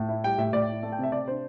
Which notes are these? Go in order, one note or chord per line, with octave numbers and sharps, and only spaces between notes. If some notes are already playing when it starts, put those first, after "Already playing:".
Already playing: A2
E4
G3 G5
A2 E5
A2 D5
E4
A3
G5
C3 E5
C3 D5
D4 C5